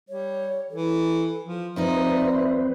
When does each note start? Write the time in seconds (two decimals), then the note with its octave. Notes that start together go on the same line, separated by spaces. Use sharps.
0.09 G3 C#5
0.71 E3 A4
1.42 F3
1.76 D#2 F3 C4 D#4 B4 C5 D5 E5